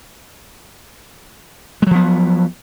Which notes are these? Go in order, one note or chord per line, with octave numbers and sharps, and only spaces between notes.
F3 F#3 G#3 B3